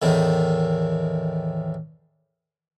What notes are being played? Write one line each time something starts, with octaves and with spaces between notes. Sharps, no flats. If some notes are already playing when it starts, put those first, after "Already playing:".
E2 A2 D#3